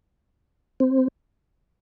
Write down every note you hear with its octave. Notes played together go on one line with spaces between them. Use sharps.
C4